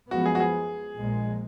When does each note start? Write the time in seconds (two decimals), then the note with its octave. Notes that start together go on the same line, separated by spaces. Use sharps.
0.11 F#2 F3 G#3 B3 F#4
0.26 G#4
0.35 F#4
0.40 G#4
0.98 A#1 A#2 G#3